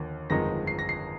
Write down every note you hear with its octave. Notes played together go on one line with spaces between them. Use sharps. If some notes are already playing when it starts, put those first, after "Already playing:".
Already playing: D#2 D3 F3 A#3
G1 F2 D#3 G#3 D#4 A#6
C7
A#6
C7